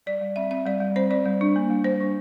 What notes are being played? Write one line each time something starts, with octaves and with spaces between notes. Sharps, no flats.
G3 D5
G3
C4 E5
C4 E5
G3 D5
G3
C4 C5
C4 D5
G3
D4
A#3
G3
G3 C5
D4